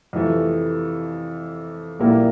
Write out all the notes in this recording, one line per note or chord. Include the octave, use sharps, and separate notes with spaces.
F2 C3 E3 A3
A#1 A#2 G3 A#3 E4